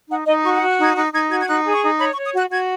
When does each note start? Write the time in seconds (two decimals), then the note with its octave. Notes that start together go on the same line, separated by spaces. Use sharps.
0.10 D#4 F#5
0.27 D#4 D#5
0.44 F#4 C#6
0.57 F#5
0.62 F#4
0.70 F#6
0.79 D#4 G#6
0.96 D#4 F#6
1.13 D#4 G#6
1.30 F#4 G#6
1.41 G#6
1.47 D#4 F#6
1.65 G#4
1.73 C#6
1.82 D#4
1.98 C#5 B5
2.12 C#6
2.16 C#5
2.25 D#6
2.34 F#4 F#6
2.50 F#4 G#6